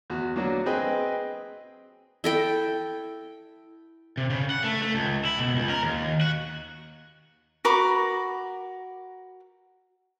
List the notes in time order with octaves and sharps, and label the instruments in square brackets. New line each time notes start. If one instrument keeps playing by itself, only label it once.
[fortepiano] E2 F#4
F#3 A#3 D4 F#4
C4 G#4 B4 D#5 G5
[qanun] E4 A4 G5
[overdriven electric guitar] C3
C#3
F#5
A3
A3
C#2
E4
B2
C#2
A#4
D#2
F#4
[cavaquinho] F#4 A#4 B5 D6